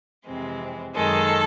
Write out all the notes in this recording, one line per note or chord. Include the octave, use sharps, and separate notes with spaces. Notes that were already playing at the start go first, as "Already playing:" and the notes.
F2 C3 E3 G#3 C4
F#2 D#3 G#3 A4